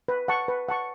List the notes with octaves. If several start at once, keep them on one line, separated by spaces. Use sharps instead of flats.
B4
F#5 A5 C#6
B4
F#5 A5 C#6